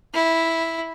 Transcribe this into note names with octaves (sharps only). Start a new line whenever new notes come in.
E4